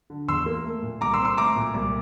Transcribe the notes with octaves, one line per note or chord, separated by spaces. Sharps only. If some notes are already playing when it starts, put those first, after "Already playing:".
D3
E2 C6 E6
A#3
A3
A#2
C2 A#5 D6
C6 E6
C4
C6 E6
A3 A#5 D6
A#2
C2